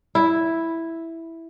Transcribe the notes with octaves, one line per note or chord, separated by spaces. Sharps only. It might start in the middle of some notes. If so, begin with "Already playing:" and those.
E4